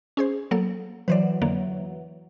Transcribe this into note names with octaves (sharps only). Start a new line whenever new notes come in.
C#4 G#4 C5
F#3 A#3 A4
E3 F#3 B4 C5 D5
F2 D3 A#3